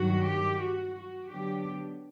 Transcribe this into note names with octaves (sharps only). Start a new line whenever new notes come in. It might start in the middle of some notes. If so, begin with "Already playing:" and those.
Already playing: G2 D#3 F#3 F#4
G4
F#4
F#4
D3 F#3 B3 D4 G4